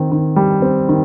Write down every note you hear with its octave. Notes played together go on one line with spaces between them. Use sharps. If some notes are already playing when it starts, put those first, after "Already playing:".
Already playing: D#3 C4
D#3
G3
C4
D#3